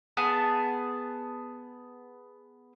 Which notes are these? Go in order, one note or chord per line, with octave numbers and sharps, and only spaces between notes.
B3 G#4 A5